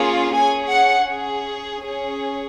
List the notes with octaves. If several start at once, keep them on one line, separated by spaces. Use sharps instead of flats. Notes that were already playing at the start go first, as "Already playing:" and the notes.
Already playing: A#3 C#4 F4 G#4
C#4 G#4 G#5
F#5
C#4 G#4
C#4 G#4